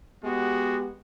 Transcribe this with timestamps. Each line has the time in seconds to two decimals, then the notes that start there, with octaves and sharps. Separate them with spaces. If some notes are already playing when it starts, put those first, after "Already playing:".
0.24 G#3 B3 F#4 G4